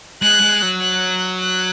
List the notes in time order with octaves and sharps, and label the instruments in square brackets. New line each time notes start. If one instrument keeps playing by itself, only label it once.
[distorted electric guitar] G#3 [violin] F#6
[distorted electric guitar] G#3
F#3
[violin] F#6
F#6